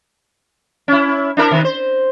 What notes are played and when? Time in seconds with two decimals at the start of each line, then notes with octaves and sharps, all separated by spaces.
0.88 C#4 E4
1.37 D4 E4 A#4
1.51 C3 D#3
1.64 C5